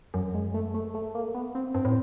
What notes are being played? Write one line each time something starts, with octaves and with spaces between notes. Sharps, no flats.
F#2 F#3
G#3
A3
A3
A3
A#3
B3
C4
G2 C4
A2